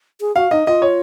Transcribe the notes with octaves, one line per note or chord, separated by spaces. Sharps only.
G#4
F#4 F5
D#4 D#5
F4 D#5
C#5